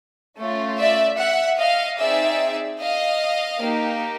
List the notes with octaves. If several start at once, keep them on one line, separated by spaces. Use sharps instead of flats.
A3 C#4 F4
D5 E5
E5 F#5
D#5 F5
C4 D#4 G#4 D5 E5
D#5 F5
A#3 D#4 G4